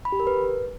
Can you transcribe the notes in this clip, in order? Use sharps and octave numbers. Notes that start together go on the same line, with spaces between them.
B5
G4
A#4
B4